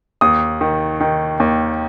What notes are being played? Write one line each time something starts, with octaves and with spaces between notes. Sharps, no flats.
D#2 D#6
D#3
D#3
D#2